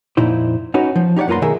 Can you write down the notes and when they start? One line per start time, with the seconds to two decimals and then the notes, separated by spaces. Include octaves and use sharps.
0.17 F2 A#2 D#4 E4 C5
0.74 C#4 D#4 F#4 B4
0.96 F3
1.16 D#4 G4 C#5 D5 F#5
1.28 F#2 A#3 F4 B4 A#5 C6
1.42 B1 D#3 A3 G#4 A#4 E5